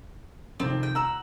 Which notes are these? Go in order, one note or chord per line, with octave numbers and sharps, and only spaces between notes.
F2 C3 D#3 C4
G5
F#5 A#5 E6